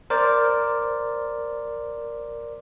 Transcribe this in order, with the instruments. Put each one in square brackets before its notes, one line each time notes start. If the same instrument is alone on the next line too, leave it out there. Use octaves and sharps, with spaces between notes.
[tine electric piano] A#4 C5 D5